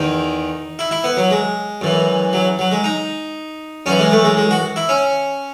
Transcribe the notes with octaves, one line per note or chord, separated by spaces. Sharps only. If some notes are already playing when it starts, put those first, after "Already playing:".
Already playing: E2 D#3 D#4
E4
E4
B3
F#3
G#3
F#2 E3
F#3
F#3
G#3
D#4
F#2 E3 C#4
G#3
A3
G#3
G#3
F#4
E4
C#4